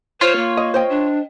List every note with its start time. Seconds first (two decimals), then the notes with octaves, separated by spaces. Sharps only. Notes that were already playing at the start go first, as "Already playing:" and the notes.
0.21 F4 C5 C#5
0.36 A#3
0.57 D#5
0.74 C5 D#5 G5
0.89 D4